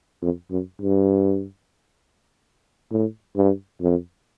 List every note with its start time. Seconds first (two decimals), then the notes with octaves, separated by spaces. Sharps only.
0.22 F2
0.51 F#2
0.82 G2
2.92 A2
3.36 G2
3.81 F2